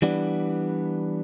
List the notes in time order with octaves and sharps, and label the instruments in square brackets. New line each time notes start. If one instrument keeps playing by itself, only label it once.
[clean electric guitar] E3 G3 B3 D4